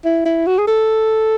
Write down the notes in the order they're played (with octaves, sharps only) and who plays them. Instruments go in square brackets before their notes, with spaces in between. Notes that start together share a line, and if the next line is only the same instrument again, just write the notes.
[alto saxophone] E4
E4
F#4
G#4
A4